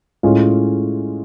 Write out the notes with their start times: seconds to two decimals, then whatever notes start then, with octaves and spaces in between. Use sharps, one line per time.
0.23 A2 G#3 C#4 F4 G#4